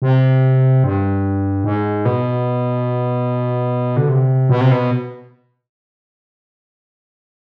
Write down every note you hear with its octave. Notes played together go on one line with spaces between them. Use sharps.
C3
G2
G#2
B2
D3
C3
B2
C3
B2